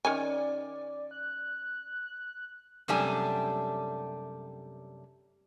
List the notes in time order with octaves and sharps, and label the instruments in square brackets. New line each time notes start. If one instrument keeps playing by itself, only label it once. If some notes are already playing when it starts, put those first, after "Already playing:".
[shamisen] D#3 C#4 G#5 [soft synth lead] D5
[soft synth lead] F#6
[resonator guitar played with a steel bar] F#2 C3 G3 A3 D4 G#5